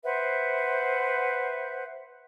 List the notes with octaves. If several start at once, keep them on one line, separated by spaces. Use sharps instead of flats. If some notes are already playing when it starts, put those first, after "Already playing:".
B4 C5 E5 F#5